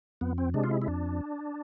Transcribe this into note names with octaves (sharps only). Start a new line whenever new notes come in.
F2 B3
C4
C3 G#3 D4
F4
E4
E4
F2 D4